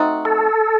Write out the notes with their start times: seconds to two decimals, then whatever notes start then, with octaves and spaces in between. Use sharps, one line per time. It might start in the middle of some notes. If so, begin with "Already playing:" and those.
Already playing: A3 C4 D#4 F#4
0.25 A4